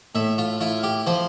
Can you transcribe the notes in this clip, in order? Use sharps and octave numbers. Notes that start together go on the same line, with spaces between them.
A2 E5
F4
E4 F4
G4
F3 C5